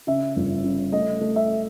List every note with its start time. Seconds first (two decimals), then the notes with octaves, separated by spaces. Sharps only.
0.07 C#3 E5
0.36 G1
0.64 C#3
0.92 A3 D#5
1.21 A3
1.36 E5